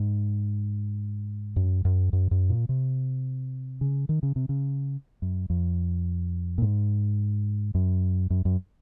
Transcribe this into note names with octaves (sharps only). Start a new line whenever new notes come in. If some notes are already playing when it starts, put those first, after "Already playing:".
Already playing: G#2
F#2
F#2
F#2
F#2
A#2
C3
C#3
D#3
C#3
C3
C#3
F#2
F2
A#2
G#2
F#2
F#2
F#2